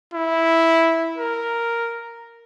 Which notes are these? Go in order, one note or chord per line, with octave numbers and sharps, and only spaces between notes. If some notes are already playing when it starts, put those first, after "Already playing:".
E4
A#4